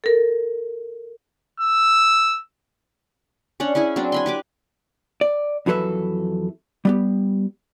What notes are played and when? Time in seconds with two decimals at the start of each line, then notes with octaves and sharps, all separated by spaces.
0.04 A4 A#4
1.60 E6
3.60 C#4 D4 C#5 F#5
3.75 C#4 E4 G#4 G#5
3.96 F#3 C4 D4
4.12 G#5 B5 C6
4.26 G4 B4 D6
5.21 D5
5.66 F2 E3 F#3 A4 B4 E5
6.85 G3 B3 G4